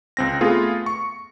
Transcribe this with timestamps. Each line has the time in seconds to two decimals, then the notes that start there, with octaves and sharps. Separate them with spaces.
0.17 C#2 C4 A#6
0.40 A3 B3 F4 G#4
0.86 C#6